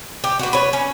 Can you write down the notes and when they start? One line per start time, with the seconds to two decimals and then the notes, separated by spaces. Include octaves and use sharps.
0.24 G4
0.39 F#4 B4
0.53 B4 C#5
0.73 C#4